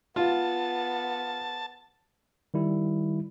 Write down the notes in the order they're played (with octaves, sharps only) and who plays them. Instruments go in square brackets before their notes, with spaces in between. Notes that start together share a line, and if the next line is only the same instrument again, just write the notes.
[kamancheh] B3 [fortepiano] F4 [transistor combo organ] A5
[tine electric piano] D#3 G3 E4